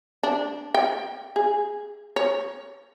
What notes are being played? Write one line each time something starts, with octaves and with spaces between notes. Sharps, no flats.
D4
G5
G#4
C#5